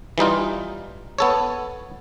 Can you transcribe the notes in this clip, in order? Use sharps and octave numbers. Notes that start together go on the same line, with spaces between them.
E3 G3 D#4 F4
B3 A4 C#5